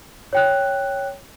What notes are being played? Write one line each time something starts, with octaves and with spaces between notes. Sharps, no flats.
C#5 G5 F#6